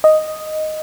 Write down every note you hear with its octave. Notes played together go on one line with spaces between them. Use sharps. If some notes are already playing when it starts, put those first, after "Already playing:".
D#5